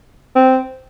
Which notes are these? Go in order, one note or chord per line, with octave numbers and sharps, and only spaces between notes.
C4